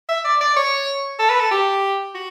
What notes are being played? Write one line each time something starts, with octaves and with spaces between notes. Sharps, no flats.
E5
D5
D5
C#5
A4
B4
A4
G4
F#4